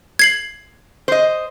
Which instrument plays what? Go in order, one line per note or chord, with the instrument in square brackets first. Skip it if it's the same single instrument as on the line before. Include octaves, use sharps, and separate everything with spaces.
[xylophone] G#6 C7 F#7
[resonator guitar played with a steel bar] C5 D#5